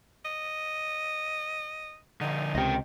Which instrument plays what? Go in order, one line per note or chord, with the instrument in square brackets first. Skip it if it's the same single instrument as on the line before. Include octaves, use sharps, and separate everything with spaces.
[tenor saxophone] D#5
[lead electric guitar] D3 F3 [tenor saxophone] D#4
[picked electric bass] C#2 C3 [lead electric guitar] D#5 G5